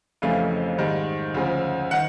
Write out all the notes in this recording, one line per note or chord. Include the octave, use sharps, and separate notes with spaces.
F1 F2 C#3 E3 A3 F5
G#2 D#3 G3
D2 C#3 F3
D#3 F#5